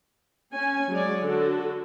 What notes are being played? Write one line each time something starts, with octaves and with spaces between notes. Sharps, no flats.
C#4 G#5
F#3 G#3 C#5 D5
D3 F#4 A4